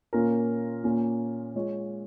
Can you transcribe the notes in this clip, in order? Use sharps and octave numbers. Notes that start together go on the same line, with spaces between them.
A#2 A#3 C#4 F4 A#4
A#2 A#3 C#4 F4
G#3 F4 C#5